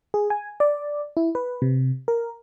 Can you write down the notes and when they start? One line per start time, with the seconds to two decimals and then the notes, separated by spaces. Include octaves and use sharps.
0.14 G#4
0.30 G#5
0.60 D5
1.17 E4
1.35 B4
1.62 C3
2.08 A#4